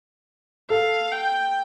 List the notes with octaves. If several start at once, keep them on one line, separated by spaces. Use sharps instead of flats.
A4 F5
G5